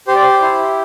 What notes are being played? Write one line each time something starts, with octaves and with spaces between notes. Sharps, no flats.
G4 C5
D5
C5
E4